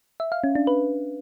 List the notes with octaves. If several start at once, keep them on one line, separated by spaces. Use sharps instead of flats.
E5
F5
C#4
D4
B4